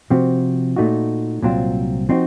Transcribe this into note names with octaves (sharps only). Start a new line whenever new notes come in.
C3 F3 C4 F#4
A#2 A3 D#4 F#4
C2 A#2 F#3 C4 F4
F3 C4 D#4 F#4